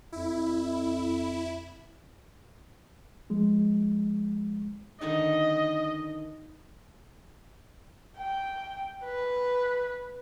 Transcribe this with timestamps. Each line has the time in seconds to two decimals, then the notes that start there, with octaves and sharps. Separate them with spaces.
0.12 F2 E4
3.30 F3 G#3
5.01 D3 D#3 D#4 D#5
8.18 G5
9.05 B4